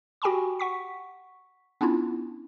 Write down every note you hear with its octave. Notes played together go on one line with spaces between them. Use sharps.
F#4 G4 G5 G#5 B5 C#6
F#5 C#6 B6
B3 C#4 D4 E4 F4